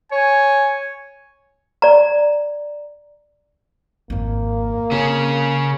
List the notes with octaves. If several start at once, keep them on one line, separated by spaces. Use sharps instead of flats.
C#5 G#5
D5 A#5
G#1 F2 A#3
C#3 C4 C#4